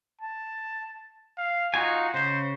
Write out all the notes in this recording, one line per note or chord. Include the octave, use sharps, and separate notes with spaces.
A5
F5
D#4 F4 F#4 G#5
C#3 C5